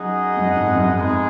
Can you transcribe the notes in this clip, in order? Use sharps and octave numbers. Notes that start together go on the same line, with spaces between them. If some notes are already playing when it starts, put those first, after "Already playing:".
Already playing: F#2 D#4 G#4 D#5 F#5
F#2
F2 G#2
F#2
F2 G#3 B3 D#4 G#4 D#5